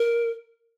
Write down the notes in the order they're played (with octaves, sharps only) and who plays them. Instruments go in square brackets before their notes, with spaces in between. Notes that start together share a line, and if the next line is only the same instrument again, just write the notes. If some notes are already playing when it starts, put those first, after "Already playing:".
Already playing: [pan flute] A#4